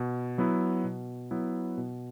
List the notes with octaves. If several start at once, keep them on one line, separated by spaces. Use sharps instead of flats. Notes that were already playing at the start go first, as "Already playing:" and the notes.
Already playing: B2
F#3 B3 E4
B2
F#3 B3 E4
B2